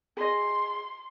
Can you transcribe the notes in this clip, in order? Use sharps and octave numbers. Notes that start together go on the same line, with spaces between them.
G#4 D#5 C6